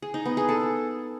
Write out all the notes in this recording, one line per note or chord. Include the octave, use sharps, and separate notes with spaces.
G#4
D#4
B3
G#4
A4